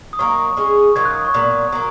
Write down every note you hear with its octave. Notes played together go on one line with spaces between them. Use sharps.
D#6
F#3 A#3 D#4 C#6
G#3 C#4 G#4 C#6
D#3 F#3 C#4 F4 G#6
F#6
D#6
C#6
A#2 F#3 B3
F#3 A#3